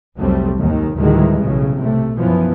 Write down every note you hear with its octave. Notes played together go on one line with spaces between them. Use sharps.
F1 C2 F#3 G3 A3 C4
D#2 G#2 D#3
D2 A2 D#3 E3 G3 G#3
B1 A2 C#3
C3 A3
F#2 B2 E3 F3 B3